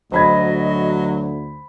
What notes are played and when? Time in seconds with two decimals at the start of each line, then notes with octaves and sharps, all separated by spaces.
0.12 D2 F#3 C5 D#5 B5 G#6